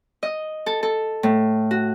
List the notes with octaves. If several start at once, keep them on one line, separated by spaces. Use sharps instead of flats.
D#5
A4
A4
A2
F#4